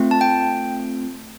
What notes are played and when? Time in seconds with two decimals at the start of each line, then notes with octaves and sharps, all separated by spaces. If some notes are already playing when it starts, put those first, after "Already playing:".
Already playing: A3 C4 F4
0.11 A5
0.21 G5